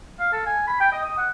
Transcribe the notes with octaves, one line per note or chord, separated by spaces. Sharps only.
F5
A4
G#5
B5
G5
D#5
D#6
F#5